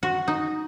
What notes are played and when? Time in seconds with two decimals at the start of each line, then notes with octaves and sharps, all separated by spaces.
0.03 F#4
0.28 D#4